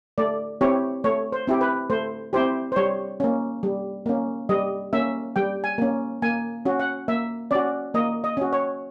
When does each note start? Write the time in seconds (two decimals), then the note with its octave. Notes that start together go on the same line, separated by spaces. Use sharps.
0.18 A3 D5
0.61 C4 E4 G4 C#5
1.04 A3 C#5
1.32 C5
1.47 C4 E4 G4
1.61 B4
1.90 A3 C5
2.33 C4 E4 G4 C5
2.72 C5
2.76 G3 C#5
3.20 A#3 C#4
3.63 G3
4.06 A#3 C#4
4.49 G3 D#5
4.93 A#3 C#4 E5
5.36 G3 G5
5.64 G#5
5.78 A#3 C#4
6.22 A#3 G#5
6.65 C#4 F#4
6.80 F#5
7.08 A#3 E5
7.51 C#4 F#4 D5
7.94 A#3 D#5
8.24 D#5
8.37 C#4 F#4
8.53 C#5